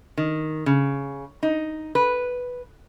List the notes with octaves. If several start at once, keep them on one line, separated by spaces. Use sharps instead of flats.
D#3
C#3
D#4
B4